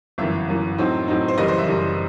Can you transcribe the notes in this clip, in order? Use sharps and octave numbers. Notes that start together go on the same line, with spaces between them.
G1 F#2 E3 E5
G1 F#2 E3
A2 F#3 C4 D#4
A2 F#3 C4 D#4
C5
F#1 F#2 E3 G3 D#5
C5
E5
F#1 F#2 E3 G3